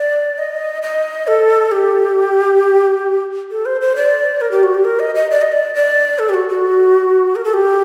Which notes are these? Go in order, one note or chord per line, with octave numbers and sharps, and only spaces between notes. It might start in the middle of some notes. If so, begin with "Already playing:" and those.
Already playing: D5
D#5
D#5
A4
G4
A4
C5
C5
D5
A#4
G4
F#4
G4
A#4
D#5
D#5
D5
D#5
D5
D5
A4
G4
F#4
F#4
A#4
A4
G4